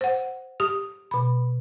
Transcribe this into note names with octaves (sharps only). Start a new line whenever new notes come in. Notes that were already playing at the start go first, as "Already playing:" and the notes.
C5 F#5
G4 D#6
B2 B5